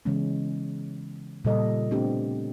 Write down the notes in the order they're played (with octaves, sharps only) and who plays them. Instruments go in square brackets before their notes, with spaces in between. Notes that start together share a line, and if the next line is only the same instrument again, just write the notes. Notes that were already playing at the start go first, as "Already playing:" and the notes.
[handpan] C#3 E3 G#3 B3 C#4
A#2 C#3 G3 A4 D#5
A3 B3 C4 D4 G4